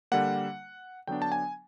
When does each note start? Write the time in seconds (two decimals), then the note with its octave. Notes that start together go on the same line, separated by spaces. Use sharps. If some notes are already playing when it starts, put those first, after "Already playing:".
0.12 D3 G3 A#3 F#5
1.07 D3 F#3 B3 D4 G5
1.22 A5
1.32 G#5